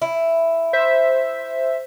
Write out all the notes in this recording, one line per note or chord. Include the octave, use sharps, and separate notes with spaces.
E4
C5 E5